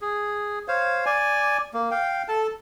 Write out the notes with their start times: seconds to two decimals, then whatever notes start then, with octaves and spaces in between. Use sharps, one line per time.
0.02 G#4
0.68 C5 C#5 F5
1.06 D5 G#5
1.74 A#3
1.91 F5 G5
2.28 A4 A5